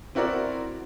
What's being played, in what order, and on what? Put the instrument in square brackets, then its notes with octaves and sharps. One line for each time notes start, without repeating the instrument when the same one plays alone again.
[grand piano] C4 E4 F#4 A#4 D5